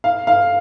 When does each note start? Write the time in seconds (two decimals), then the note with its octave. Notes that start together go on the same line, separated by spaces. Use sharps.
0.04 F5
0.27 F5